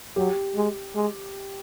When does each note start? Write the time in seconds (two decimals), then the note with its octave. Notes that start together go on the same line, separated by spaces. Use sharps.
0.16 F#3 G4
0.55 G#3
0.95 G#3